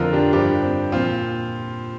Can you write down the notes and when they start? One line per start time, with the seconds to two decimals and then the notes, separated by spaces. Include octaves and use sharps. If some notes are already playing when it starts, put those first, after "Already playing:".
Already playing: F2 D3 F3 F4 A#4
0.13 D4 G4
0.33 G2 F3 D4 G4
0.62 C4
0.92 A#2 F3 C4 F4